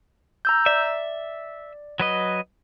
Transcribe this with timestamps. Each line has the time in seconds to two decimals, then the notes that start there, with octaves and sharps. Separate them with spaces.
0.45 A#5 E6 G6
0.66 D5 E5
2.00 F#3 B4 D#5